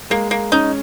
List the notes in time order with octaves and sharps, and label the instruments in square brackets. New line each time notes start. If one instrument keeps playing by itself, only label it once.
[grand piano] G#3 [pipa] A#3
[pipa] A#3
[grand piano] C#4 [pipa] D#4